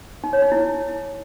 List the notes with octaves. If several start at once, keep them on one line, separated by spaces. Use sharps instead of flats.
D#4
C#5
D#4
E4